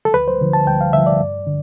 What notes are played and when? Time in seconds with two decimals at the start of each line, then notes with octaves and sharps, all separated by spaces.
0.05 A4
0.14 D2 B4
0.28 C5
0.41 D3 F3
0.53 A5
0.67 D2 G5
0.81 F5
0.93 D3 F3 E5
1.06 D5
1.20 G2
1.47 D3